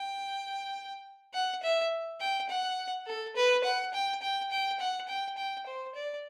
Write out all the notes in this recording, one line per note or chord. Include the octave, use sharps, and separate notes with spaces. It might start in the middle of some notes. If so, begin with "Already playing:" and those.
Already playing: G5
F#5
E5
G5
F#5
A4
B4
F#5
G5
G5
G5
F#5
G5
G5
C5
D5